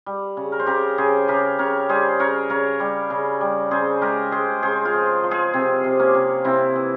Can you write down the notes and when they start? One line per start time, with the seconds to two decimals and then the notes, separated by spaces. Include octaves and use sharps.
0.06 G3
0.37 C#3
0.52 A#4
0.59 C5
0.66 C#3 G4 A#4
0.98 C#3 G#4 C5
1.28 C#3 G4 A#4
1.59 C#3 A#4 C#5
1.89 G3 G#4 C5
2.19 C#3 A#4 C#5
2.49 C#3 A#4 C#5
2.80 G3
3.10 C#3
3.41 G3
3.71 C#3 G#4 C5
4.01 G#3 G4 A#4
4.32 G#3 G#4 C5
4.62 C#3 G#4 C5
4.85 F4 G#4
4.93 F3
5.24 F3
5.31 F4 G#4
5.54 C3 C4
5.84 C3
5.99 A#3 C#4
6.14 C3
6.44 C3 C4 E4
6.76 E3